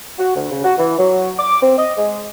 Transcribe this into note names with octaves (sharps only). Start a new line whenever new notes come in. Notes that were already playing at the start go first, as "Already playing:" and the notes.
F#4
D2
C#3
F#4
E3
F#3
D6
C4
D#5
G#3